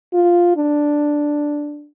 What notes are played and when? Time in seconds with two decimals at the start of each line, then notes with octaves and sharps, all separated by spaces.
0.14 F4
0.57 D4